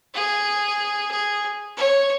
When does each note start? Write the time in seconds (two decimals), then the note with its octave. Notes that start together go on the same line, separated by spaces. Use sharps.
0.14 G#4
1.11 G#4
1.77 C#5